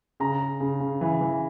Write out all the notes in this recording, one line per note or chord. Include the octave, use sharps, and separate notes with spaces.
C#3 A#5
C#3
C#3
C#3
E3
E3